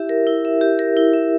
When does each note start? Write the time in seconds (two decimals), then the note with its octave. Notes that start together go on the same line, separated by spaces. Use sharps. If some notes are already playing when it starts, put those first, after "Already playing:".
Already playing: E4 G4 E5
0.09 A#4
0.27 E4
0.45 E5
0.61 G4
0.79 A#4
0.97 E4
1.13 E5